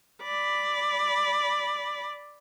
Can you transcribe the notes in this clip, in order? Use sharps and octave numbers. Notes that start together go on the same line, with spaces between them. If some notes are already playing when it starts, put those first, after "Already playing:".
D5 B5